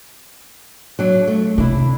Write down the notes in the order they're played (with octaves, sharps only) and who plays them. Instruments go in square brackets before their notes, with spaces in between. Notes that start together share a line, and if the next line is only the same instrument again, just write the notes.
[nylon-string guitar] F#3 D4
A3
[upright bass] C3 [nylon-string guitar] D4 E4